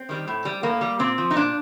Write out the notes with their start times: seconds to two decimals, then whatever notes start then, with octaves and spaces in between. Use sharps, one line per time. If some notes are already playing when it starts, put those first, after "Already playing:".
Already playing: C4
0.09 D#3 G3
0.27 A2
0.45 G3
0.63 A2 A#3
0.81 G3
0.99 A#2 C4
1.18 F3
1.31 D#4
1.35 A#2 D4